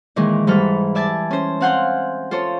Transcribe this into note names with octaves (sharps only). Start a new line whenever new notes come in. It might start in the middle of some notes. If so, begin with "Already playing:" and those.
A#2 D#3 E3 G#3
G#2 E3 G3 A4 B5 F6
D5 E5 G#5 A5
C#4 C5
C4 F5 F#5 G#5 C6 G6
F4 A4 C5 C#5